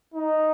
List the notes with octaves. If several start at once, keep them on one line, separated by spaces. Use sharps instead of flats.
D#4